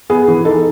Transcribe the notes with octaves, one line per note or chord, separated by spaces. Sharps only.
B3 G#4
E3
D#4 A4